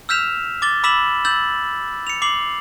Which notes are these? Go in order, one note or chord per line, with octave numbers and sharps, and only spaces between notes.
E6 F6 G6 B6 E7 F7
D6 A6 G7
B5 D6 E6 B6 E7 F#7
E6 G6 A6 F#7
C#7 F7
D6 C7 F#7